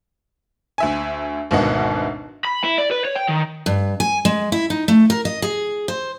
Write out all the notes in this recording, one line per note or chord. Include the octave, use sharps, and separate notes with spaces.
D2 E5 G#5
G#1 D2 B2 D#5 F#5
B5
E4
D5
B4
C#5
G5
D#3
G2
G#5
G#3
E4
D#4
A3
A#4
D#5
G#4
C5